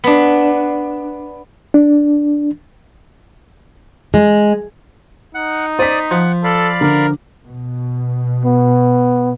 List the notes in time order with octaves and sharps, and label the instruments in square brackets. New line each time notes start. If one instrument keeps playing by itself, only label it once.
[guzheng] B3 D4
[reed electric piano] D4
[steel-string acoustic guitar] G#3
[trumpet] D#4 [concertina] F#5
[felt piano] C5 B6 [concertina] D5 D#6
[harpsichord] F3 [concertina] F#5
[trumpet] A4 [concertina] D5 F5 B5
[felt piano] D3 D6 [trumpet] A#4
[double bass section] B2
[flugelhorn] B3